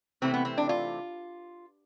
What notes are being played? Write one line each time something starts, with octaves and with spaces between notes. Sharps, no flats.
C3 E3 A3 C4
B3
C4
D4
F4